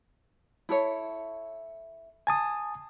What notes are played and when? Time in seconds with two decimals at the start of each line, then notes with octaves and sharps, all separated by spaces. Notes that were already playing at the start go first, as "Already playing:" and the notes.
0.69 E4 A4 C#5
2.27 G#5 A5 D#6